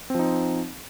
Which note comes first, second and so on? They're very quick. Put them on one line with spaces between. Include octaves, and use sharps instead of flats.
C4 F3 D#4